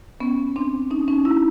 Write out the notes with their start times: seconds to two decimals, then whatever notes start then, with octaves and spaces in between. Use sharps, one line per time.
0.20 B3 C#4
0.56 C4 D4
0.91 C#4 D#4
1.08 C#4 D#4
1.25 D4 E4